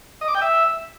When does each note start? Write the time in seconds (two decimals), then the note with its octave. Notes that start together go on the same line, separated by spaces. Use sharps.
0.21 D#5
0.28 D6
0.35 G5
0.41 E5